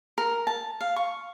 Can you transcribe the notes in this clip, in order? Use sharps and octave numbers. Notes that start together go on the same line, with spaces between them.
A#4
A5
F5
C#6